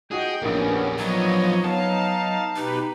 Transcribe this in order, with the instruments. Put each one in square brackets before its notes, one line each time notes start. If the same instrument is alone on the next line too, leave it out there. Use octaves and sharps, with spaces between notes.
[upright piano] D#4 F#4 D#5 [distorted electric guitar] G#4 [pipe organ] G5
[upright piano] A#1 A#3 [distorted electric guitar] E2 G3 [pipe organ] B3 C#4
[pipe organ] F3 C#5 D#5 [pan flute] F#3 [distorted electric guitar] B3 D#4
[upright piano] B3 C#5 [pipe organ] D#4 F5 [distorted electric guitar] A5
[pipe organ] B2 G4 B4 [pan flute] D#4